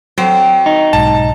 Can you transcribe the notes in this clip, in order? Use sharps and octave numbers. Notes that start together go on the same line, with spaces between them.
F#3 C4
D#4
B1 G#2 A5